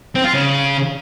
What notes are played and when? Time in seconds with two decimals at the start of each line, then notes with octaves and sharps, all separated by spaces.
0.15 C4
0.24 F4
0.34 C#3